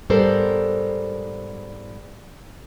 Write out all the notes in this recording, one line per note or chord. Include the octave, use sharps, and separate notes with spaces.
G#2 G3 B3 A4 A#4 C5